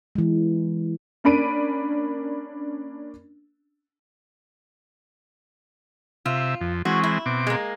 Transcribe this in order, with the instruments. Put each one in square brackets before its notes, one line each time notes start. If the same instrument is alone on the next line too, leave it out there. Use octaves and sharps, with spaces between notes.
[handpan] E3 G#3
[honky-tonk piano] A#3 C#4 D4 B5 D7 D#7
[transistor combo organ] C3 E5 [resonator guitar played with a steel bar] F4
[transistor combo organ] F2
[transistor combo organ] E3 G#3 C4 [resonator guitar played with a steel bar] F#4
[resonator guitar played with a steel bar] E4
[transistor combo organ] B2 C4 D6
[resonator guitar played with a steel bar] G#3 A#3